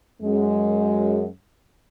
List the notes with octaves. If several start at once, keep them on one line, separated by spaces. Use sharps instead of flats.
F#2 G#3